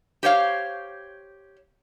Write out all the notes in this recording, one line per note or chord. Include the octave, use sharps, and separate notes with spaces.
G4 C5 C#5 F5